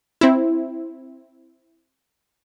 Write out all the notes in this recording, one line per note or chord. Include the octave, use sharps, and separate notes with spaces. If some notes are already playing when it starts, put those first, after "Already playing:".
C4 E4